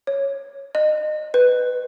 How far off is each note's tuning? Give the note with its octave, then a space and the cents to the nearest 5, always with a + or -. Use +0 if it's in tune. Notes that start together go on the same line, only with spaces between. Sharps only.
C#5 -5
D#5 -25
B4 +10